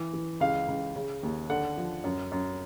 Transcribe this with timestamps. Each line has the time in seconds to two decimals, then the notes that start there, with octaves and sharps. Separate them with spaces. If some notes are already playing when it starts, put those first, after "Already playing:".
Already playing: E3
0.13 E3
0.40 C#2 F5
0.68 C#2
0.96 C#3
1.23 D#2
1.50 D3 F#5
1.77 F3
2.04 F#2
2.32 F#2